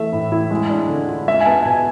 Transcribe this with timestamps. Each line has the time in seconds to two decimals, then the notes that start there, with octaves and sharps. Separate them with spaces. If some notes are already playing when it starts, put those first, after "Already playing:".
Already playing: E3 A3 E5
0.12 A2
0.32 E4
0.51 G#3
0.69 D4
0.89 D3
1.08 F4
1.28 G#3 E5
1.41 G#5
1.46 B3 A5
1.65 B2 G#5